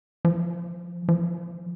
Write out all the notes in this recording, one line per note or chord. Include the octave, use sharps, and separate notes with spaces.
F3
F3